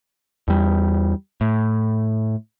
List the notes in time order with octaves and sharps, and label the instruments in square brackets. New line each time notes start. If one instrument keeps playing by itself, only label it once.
[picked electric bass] E2 G3
A2